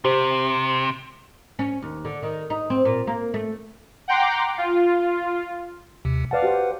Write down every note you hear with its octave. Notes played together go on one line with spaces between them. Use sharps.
C3 G4 C5
C#4
D#2
D3
D#3
D#4
C4
A#2
A#3
A3
F#5 G5 A#5 C6 D6
F4
D#2 C3
B4 D5 F5 F#5 A5
F#4 G4 C5